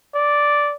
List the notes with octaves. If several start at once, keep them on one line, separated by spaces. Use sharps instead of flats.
D5